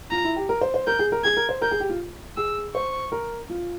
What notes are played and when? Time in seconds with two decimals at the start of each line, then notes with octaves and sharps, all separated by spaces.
0.11 F4 A#5
0.24 E4
0.36 G4
0.49 A#4
0.61 C5
0.74 C5
0.87 A#4 G6
0.99 G#4
1.12 A#4
1.24 G#4 G#6
1.37 A#4
1.49 C5
1.62 A#4 G6
1.71 G#4
1.80 G4
1.89 F4
2.37 G#4 E6
2.74 C5 C#6
3.12 A#4
3.50 F4